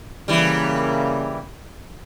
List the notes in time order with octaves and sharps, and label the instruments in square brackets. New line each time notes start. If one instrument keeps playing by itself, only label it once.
[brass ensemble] C#3 A#3 [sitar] E3 G3